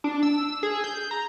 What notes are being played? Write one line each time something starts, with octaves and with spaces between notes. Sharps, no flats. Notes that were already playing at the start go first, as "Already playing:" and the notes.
D4
E6
G#4
G6
A#5